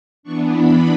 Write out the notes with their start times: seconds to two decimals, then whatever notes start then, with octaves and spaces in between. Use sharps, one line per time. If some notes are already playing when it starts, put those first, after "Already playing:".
0.23 E3 B3 D4 C#6
0.52 B5